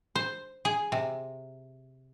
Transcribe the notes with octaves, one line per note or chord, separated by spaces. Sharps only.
C5
G#4
C3